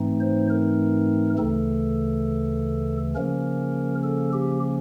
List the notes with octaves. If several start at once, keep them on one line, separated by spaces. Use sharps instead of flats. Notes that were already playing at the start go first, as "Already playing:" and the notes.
Already playing: G#2 E3 A3 C4 D#4
C5
A#4
D2 C#3 E3 A3 A4
C#3 F3 A#3 C#4 A#4
A4
G4